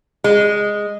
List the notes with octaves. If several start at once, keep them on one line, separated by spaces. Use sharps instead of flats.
G#3